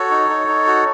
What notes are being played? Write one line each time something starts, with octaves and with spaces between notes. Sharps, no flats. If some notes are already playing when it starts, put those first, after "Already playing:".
Already playing: F#4 A4 C#5
D#4
D#4
D#4
F#4